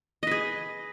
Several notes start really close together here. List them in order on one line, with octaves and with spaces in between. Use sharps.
D#5 B4 G#4